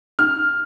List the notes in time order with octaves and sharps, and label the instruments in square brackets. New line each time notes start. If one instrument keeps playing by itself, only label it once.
[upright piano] F6